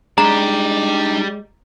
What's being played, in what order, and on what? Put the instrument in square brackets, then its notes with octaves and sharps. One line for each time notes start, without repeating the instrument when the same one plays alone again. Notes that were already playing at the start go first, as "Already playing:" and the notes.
[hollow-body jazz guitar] G#3 [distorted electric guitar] D4 D#4 [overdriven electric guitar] G4 D5 [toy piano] A#5